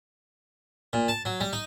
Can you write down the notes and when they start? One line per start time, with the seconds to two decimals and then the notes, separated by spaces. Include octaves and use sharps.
0.93 A#2
1.08 A5
1.25 F#3
1.41 G3
1.53 D#4